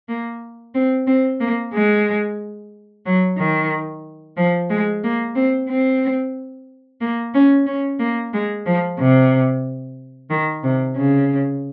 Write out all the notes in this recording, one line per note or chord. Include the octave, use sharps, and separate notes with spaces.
A#3
C4
C4
A#3
G#3
F#3
D#3
F3
G#3
A#3
C4
C4
A#3
C#4
C#4
A#3
G#3
F3
C3
D#3
C3
C#3